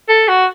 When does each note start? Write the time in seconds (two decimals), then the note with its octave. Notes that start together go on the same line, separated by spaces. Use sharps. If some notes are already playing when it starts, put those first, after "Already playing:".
0.09 A4
0.28 F#4